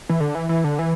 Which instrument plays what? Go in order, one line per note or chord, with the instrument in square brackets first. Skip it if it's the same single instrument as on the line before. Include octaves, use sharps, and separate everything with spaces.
[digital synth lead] E3
D3
E3
E3
D3
E3